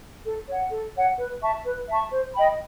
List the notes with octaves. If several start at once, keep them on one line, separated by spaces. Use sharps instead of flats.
A4
C#5 F#5
A4
C#5 F#5
B4
E5 A5 C#6
B4
E5 A5 C#6
C5
D#5 G5 B5